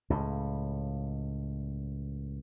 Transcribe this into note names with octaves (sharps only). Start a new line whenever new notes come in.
C#2 A2